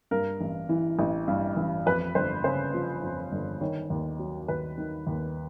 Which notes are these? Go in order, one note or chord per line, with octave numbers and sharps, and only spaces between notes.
G2 A#4
A1
E3
A1
G2
A1
F2 B4
G1 C5
C#3 C5
F3
F2
G1
D#3 C#5
D#2
F#3
D#2 B4
D#3
D#2